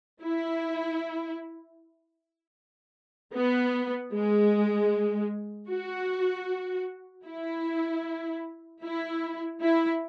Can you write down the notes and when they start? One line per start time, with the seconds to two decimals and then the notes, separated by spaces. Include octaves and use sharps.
0.22 E4
3.35 B3
4.14 G#3
5.70 F#4
7.26 E4
8.83 E4
9.61 E4